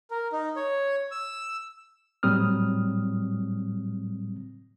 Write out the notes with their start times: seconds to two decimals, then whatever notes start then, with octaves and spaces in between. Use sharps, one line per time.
0.11 A#4
0.32 D#4
0.56 C#5
1.11 E6
2.23 A2 F#3 G3 C4 D#6 F6